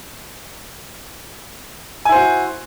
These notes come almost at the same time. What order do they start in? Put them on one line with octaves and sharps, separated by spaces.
G#5 E4 C5 F#4